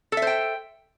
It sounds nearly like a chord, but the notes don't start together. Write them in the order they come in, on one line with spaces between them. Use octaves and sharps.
A4 E5 C5 G5